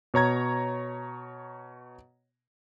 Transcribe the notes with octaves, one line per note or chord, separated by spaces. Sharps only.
B2 C#5 A#5 G#6